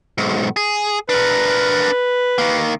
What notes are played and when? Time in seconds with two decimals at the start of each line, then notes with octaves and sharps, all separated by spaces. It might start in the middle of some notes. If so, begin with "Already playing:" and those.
0.18 B1 G#2
0.56 G#4
1.09 D4 A#4 B4
2.38 D#3 A#3